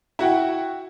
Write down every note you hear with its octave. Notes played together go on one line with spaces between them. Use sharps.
E4 F#4 F#5 G5